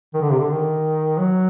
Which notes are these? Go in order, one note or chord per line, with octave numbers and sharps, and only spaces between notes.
D#3
D3
C3
D3
D#3
F#3